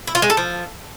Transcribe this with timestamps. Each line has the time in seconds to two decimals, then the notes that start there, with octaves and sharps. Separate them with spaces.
0.07 E4
0.15 F4
0.22 G#3
0.30 A4
0.37 F3